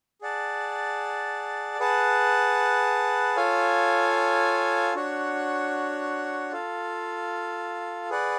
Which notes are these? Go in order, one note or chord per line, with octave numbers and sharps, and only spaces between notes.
G#4 D5 F#5 A5
G#4 B4 F#5 A5
F4 A4 C#5 F5 G#5
D4 F#4 C#5 F#5
F4 A4 F5
G#4 B4 D5 F#5